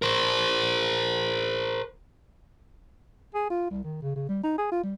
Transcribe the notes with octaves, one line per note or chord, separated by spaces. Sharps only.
A#4 C5
G#4
F4
C2
D#3
C#3
C#3
G3
D#4
G#4
F4
G3